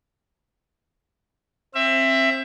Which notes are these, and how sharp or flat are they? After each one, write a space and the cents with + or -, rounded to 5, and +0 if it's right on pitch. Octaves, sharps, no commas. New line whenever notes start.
C4 +25 E5 +15